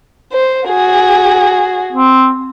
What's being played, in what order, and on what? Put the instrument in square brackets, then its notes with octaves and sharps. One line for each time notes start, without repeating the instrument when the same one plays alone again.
[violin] C5
F#4 G#4
[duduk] C4